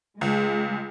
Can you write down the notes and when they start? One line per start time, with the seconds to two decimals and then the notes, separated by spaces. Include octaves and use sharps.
0.21 C#2 G#3